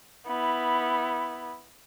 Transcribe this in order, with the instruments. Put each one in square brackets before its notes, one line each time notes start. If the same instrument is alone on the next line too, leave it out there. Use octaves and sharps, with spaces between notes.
[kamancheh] B3 E4